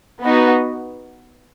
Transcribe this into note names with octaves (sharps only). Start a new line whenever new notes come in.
B3 D#4 F#4